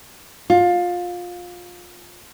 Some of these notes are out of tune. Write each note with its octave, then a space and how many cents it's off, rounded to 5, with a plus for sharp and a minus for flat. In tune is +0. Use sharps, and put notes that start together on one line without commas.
F4 +20